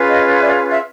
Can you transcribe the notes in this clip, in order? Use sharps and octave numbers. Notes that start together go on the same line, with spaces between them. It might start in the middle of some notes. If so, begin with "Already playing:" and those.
Already playing: C#4 F4 G#4 B4
D#5 F5
D5 E5
E5